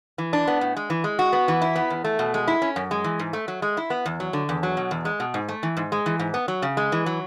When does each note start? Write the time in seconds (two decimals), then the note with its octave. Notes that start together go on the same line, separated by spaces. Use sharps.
0.18 E3
0.33 D4
0.48 B3
0.61 A2
0.77 G#3
0.90 E3
1.04 G#3
1.19 F#4
1.33 B3
1.48 E3
1.62 E4
1.76 B3
1.90 E2
2.04 A3
2.19 B2
2.34 G#3
2.48 E4
2.62 C#4
2.76 F#2
2.91 G#3
3.04 E3
3.19 G#2
3.33 A3
3.48 F#3
3.62 G#3
3.77 E4
3.90 B3
4.06 E2
4.20 F#3
4.33 D3
4.49 E2
4.63 F#3
4.77 B2
4.91 E2
5.05 G#3
5.20 B2
5.34 G#2
5.48 A3
5.63 E3
5.77 G#2
5.92 G#3
6.06 E3
6.19 G#2
6.34 B3
6.48 F#3
6.62 C#3
6.77 G#3
6.92 E3
7.06 F#3